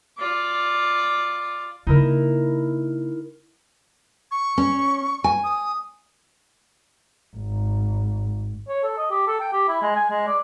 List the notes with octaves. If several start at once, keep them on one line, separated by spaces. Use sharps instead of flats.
F4 D5
C#3 A#3 D#4 E4 A#4
C#6
C#4
G#5
D#6
G#1
C#5
A4
D#5
G4
A4
G5
G4
E4
G#3
G#5
G#3
D5